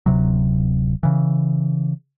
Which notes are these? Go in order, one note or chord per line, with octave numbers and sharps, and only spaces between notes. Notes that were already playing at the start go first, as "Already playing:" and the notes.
D1 C3 F#3
C#3 E3